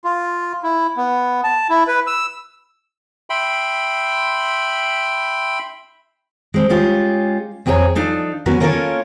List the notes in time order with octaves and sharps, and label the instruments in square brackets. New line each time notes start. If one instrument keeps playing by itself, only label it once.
[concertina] F4
E4
B3
A5
E4
B4
E6
[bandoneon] E5 G5 B5 C6
[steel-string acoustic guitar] G#3 C4
G#3 C#4 F4 G4
F2 C4 G#4 A4 C#5 A#5
F3 D4 D#4 A4
F#3 B3 C#4 F#4 A#4
A#3 C#4 F4 A4 A#4 C#5